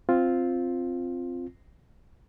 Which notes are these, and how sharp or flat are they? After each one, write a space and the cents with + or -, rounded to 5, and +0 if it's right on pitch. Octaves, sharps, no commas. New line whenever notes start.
C4 +0 F4 +0